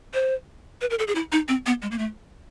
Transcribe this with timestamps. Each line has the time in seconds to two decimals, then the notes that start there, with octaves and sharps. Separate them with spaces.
0.14 C5
0.81 B4
0.90 A#4
0.99 A4
1.07 G#4
1.15 E4
1.32 D#4
1.48 C4
1.66 B3
1.82 G#3
1.91 A#3
1.99 A3